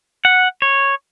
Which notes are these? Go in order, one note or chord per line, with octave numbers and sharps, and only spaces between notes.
F#5
C#5